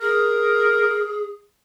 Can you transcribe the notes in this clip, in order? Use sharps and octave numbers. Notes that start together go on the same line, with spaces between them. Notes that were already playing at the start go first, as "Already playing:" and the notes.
G#4 A#4